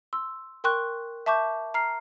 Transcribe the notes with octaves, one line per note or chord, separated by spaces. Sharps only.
C6 E6
A#4 G5 C6 C#6 F#6
E5 A5 C#6 D6 G6
A#5 F6 C7